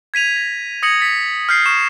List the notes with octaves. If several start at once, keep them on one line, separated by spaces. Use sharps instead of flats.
G#6 B6 D#7 F7
A#6
D#6 G#6 A#6 C#7 F#7
A6 B6
F6 G6 C7
C#6 E7